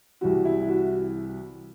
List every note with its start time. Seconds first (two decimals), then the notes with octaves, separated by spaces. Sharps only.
0.21 C2 C3 E3 F#4
0.45 E4
0.68 F#4